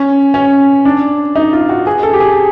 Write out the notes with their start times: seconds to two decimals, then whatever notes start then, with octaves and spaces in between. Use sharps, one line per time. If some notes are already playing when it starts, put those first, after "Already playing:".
Already playing: C#4
0.34 C#4
0.85 D4
1.36 D#4
1.53 F4
1.69 F#4
1.87 G#4
2.03 A4
2.13 G4
2.20 G#4